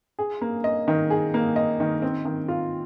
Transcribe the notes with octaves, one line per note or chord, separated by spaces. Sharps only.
G#4
A#3
D#5
D#3
G#4
A#3
D#5
D#3
C4
D#3
F4